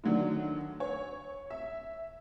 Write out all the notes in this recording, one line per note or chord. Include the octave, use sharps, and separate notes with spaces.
D3 D#3 F#3 A3 D4
C#5
E5